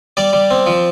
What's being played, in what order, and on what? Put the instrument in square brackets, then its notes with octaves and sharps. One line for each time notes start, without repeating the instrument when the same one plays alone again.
[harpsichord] G3 D5
G3
C4
F3